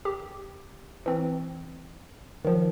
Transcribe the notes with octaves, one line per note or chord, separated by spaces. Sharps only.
G4
E3 C4
D#3 F3